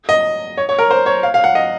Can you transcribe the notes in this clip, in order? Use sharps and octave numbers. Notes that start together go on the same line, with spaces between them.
D#5
C#5
C#5
A#4
C5
C#5
F5
F5
F#5
D#5